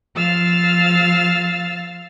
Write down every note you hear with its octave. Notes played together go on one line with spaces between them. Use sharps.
F3 F5 E6 F6 A6